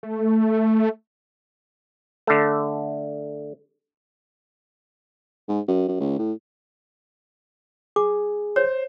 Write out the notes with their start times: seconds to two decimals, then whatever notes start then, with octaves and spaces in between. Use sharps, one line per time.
0.03 A3
2.27 D3 A3
5.48 G#2
5.68 F#2
5.88 F#2
6.00 C#2
6.18 A2
7.96 G#4 D6
8.56 C5 C#5